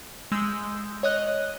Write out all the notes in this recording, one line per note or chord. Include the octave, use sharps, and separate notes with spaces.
G#3 E6 G6
C#5 D#5 F#6